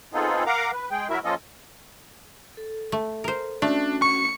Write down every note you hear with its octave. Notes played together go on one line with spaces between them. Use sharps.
B3 C4 D#4 F4 G#4 A4
A#4 F5 F#5 A#5 D6
B4
G#3 G#4 G5
F#3 E4 F#4 A#4 E5
F3 A#3 C#4 F4 A4 D#5
A4
A3
A#4 C5
A3 C#4 D4 F#4
C#6 C#7